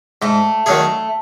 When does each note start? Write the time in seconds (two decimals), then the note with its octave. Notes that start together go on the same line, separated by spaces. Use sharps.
0.22 G#2 A3
0.66 D#3 F#3 A3 C#4 G#4